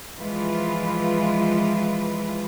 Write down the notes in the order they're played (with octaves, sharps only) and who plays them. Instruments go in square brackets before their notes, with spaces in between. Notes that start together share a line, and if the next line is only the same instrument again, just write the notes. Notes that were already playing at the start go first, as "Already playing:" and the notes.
[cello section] E3 F3 G#3 F4 B4